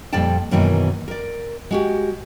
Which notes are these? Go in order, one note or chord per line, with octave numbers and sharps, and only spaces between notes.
F2 A#2 G3 D5 G5 A5
F#2 B2 D#3 E3 A#3
A#4 D5
G#3 F#4 G4